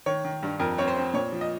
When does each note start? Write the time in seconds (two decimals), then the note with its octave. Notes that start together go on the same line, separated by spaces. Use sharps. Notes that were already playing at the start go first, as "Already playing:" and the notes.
0.06 D#3 C#5
0.25 D#3
0.43 G2
0.60 F2 A#4
0.78 C4 C#5
0.88 C5
0.96 C4
1.14 A#2 C#5
1.32 F3
1.41 D#5